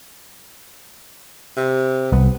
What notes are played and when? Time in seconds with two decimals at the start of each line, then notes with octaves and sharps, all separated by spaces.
1.57 C3
2.12 C2 B3